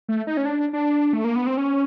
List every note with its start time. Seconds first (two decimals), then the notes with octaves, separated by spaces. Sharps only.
0.09 A3
0.27 D#4
0.37 C#4
0.45 D4
0.73 D4
1.13 A3
1.24 A#3
1.36 B3
1.46 C4
1.57 C#4